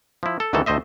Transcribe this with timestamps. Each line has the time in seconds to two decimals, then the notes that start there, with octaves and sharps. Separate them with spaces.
0.23 F3 E4
0.40 A4
0.53 D2 D#3 E3 G3 A4
0.66 D2 A3 C5 D#5 E5